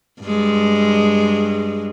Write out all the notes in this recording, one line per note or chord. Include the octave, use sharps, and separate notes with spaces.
G2 G#3